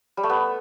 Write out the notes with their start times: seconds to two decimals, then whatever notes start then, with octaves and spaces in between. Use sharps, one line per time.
0.17 G3
0.23 A3
0.30 B3